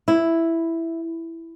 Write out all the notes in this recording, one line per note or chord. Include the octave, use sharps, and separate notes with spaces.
E4